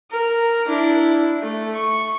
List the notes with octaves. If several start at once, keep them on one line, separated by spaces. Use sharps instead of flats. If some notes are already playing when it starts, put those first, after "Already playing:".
A#4
D4 E4
A3
C#6